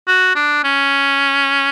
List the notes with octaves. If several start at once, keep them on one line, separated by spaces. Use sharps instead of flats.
F#4
D4
C#4